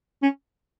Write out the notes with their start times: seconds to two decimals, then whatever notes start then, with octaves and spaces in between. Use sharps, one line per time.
0.22 C#4